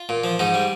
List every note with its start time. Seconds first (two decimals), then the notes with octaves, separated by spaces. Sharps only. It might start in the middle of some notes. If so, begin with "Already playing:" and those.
Already playing: F4
0.09 A#2
0.24 F3
0.39 G#2 D#4
0.54 G3